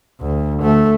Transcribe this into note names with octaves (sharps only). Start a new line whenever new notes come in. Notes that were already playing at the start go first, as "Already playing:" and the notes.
D2
A3